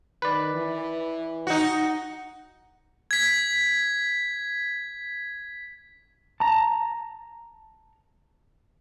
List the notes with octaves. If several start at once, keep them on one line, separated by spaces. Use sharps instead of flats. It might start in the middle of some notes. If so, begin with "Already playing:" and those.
D#3 B4 D5
E3
D#4 F#4
G#6 B6
A5 A#5